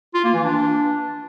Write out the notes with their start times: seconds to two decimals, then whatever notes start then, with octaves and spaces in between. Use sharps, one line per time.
0.14 F4
0.24 A#3
0.34 E3
0.43 D4